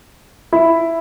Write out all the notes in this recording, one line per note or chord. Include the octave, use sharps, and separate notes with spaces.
E4